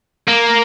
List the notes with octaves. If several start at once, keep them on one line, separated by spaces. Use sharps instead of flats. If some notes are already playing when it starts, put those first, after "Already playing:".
A#3